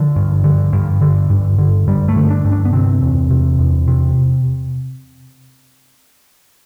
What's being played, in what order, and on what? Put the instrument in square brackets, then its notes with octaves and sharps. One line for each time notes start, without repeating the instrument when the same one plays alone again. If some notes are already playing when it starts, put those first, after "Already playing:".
Already playing: [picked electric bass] D3 F3
G2
D3
G2
D3
G2
D3
G2 G3
A3
D3
D4
G2
D4
B3
C3 C4
E2
C3
E2
C3